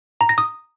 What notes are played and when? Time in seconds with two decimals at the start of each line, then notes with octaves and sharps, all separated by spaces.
0.21 A#5
0.29 A#6
0.38 D#6